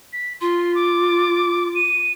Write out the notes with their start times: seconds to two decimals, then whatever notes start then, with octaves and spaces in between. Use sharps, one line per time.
0.13 B6
0.41 F4 C6
0.75 D6
1.75 D#7